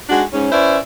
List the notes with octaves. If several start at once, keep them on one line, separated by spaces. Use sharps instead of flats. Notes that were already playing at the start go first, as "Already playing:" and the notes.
G#3 D4 D#4 F#4
G#2 C#4
C#4 E4 B4 C5 D5 E5